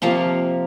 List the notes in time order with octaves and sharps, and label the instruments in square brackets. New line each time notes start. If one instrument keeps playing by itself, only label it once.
[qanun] C3 F3 A#3 F5